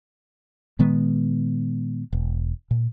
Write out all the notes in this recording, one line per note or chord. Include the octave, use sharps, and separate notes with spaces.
A#2 D#3 G#3 B3
E1
A#2